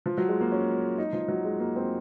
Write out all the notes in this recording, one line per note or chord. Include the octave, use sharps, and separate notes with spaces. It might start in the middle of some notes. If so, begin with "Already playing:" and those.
F3
F#3
G#3
A#3
C#4
D#4
F3
F#3
G#3
A#3
C4